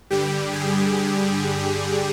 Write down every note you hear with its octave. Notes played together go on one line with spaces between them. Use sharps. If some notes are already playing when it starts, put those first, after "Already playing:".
G2 D3 G3 G4
G#4
G#4